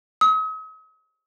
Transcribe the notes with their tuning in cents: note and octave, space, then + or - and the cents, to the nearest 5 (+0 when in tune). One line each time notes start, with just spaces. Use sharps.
D#6 +45